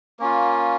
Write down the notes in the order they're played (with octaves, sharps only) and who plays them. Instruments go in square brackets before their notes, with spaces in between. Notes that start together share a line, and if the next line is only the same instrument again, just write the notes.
[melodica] A#3 C#4 F4